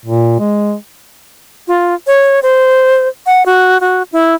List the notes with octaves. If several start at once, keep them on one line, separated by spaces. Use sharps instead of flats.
A#2
G#3
F4
C#5
C5
F#5
F#4
F#4
E4